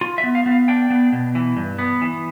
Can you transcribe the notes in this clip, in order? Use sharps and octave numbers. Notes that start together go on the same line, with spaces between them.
F4
E5
B3
F5
B3
F5
D4 G5
B3
B2
E3
G2
B3
E3